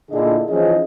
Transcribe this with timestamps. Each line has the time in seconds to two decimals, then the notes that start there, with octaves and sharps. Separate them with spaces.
0.10 A#2 D3 D4 E4 G#4 D#5
0.48 E3 F3 C#4 D#4 G#4 D#5